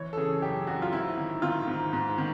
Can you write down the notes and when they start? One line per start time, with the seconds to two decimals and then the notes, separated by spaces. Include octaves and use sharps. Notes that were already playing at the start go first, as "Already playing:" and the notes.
Already playing: E3 C#5
0.13 A4
0.17 C#3 G#4
0.42 F#2 G4
0.67 F#2 F#4
0.82 F4
0.92 G#2 E4
1.17 D#3
1.42 D#3 F4
1.67 G#2
1.93 G#2
2.18 D#3